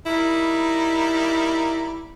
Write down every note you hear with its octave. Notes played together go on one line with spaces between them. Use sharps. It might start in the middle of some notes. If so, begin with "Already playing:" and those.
G3 A#3 D#4 E4